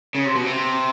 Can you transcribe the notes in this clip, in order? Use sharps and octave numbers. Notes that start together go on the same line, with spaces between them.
C#3
C3
B2
C3